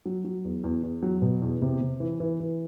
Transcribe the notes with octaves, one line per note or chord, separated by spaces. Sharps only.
F#3
F#3
E2
E2
E2
F#3
B2
E2
C3
C3
E3
E3
E3